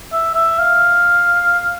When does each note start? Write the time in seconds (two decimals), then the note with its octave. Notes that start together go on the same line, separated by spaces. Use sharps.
0.13 E5
0.35 E5
0.59 F5